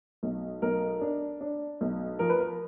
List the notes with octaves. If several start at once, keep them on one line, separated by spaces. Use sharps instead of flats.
B1
B1 A#4
D4
D4
B1
F3 A#4
B4
A#4